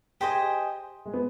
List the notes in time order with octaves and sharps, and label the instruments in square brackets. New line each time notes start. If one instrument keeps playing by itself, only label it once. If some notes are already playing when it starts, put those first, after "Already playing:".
[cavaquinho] G4 C5 D#5 G#5 [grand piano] G#4
[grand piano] G#3
B3